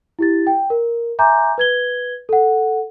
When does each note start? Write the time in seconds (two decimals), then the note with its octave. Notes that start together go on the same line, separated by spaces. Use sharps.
0.19 E4 G4 A6
0.47 G5
0.70 A#4
1.19 E5 G#5 A#5 C6 D6 G6
1.58 B4 G#6 G7
2.29 A4 F#5